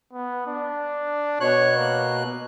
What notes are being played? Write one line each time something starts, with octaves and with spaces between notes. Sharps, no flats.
B3
D4
B2 C#5 F#6
A#3